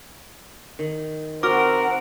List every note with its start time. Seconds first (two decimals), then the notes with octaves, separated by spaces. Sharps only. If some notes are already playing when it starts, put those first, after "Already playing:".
0.79 D#3
1.43 C4 F#4 A#4 F#5 D6 F6